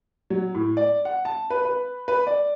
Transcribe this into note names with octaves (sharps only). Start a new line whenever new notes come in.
F#3
A2
D5
F#5
A5
B4
B4
B4
D5